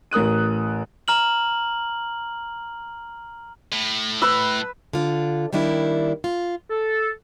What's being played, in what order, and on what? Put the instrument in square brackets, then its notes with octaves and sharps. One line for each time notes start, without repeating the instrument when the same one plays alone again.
[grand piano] A1 A#4 D#6 F#6 D#7
[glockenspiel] A#5 F6 F#7
[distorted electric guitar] A2
[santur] B4 B5 E6
[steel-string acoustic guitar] D3 F4
D#3 G3 A#3 D4 E4
F4
[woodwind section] A4